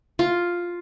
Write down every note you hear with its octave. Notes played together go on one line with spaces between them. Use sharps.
F4